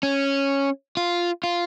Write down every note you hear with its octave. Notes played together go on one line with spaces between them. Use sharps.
C#4
F4
F4